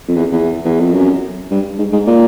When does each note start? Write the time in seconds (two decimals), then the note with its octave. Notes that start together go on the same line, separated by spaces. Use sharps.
0.08 F2
0.16 E2
0.32 E2
0.65 E2
0.80 F2
0.93 F#2
1.51 G2
1.78 G#2
1.93 G#2
2.07 A#2